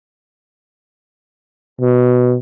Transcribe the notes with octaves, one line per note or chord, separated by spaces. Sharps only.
B2